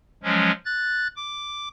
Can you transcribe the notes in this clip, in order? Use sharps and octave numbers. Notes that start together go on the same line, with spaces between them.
F3 F#3 G#3 C#4
F#6 A6
D6